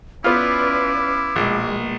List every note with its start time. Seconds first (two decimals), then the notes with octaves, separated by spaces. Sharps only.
0.24 B3 C#4 E4 F4 B4 D5 D6
1.36 A#1 B2 G#3 A#3